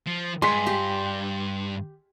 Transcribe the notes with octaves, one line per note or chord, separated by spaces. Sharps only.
F3
G2 G#3 C6 B6
G4